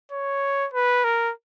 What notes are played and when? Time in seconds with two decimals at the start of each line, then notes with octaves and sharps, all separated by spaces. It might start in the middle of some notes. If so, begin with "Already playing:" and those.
0.12 C#5
0.74 B4
1.04 A#4